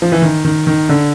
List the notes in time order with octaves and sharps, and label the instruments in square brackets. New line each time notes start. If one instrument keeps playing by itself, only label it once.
[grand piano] F3
E3
D#3
D#3
D#3
D3